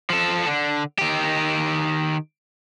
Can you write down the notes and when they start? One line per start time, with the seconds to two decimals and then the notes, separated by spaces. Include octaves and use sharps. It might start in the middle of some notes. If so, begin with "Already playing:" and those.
0.10 F3 A4
0.47 D3
0.99 D#3 G4